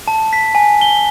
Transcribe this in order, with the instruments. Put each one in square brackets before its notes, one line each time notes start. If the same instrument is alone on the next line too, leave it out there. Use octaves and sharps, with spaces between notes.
[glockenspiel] A5
B6
G#5
G7